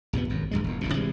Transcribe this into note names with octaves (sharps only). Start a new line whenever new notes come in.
A#1 F2 C3 B3
G#1 F#2
G#1 C#2 G2 G#3
E1 E2
F#1 B1 F#2 A#2
C3 E3 G3 G#3